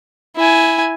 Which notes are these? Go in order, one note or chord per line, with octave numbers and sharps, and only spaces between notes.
E4 G#5